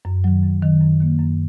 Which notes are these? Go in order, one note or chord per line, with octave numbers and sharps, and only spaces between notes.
F#2
D#3 F#3
F#2
D#3 F#3
F#2
D#3 A#3
F#2